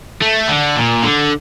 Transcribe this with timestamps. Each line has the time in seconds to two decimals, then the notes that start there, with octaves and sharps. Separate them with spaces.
0.22 A3
0.49 D3
0.76 A#2
1.03 D3